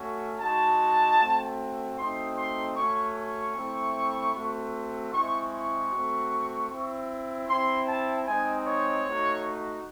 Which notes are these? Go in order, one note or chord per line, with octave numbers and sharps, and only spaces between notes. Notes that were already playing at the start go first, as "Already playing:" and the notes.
Already playing: A3 C#4 F#4
G#3 D#4 F#4 A5
A3 C4 F#4
A3 C4 D#4 F#4 C6
C6
A3 C#4 F#4 C#6
C#6
A3 C4 E4
A3 C4 F#4
G#3 C4 E4 C#6
C#6
A3 C4 F#4
C4 E4
C4 E4 C6
A5
G#3 C4 D#4 G#5
C#5
A3 D#4 F#4